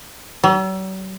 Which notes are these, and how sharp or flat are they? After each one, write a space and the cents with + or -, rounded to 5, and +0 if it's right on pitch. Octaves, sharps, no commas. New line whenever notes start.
F#3 +45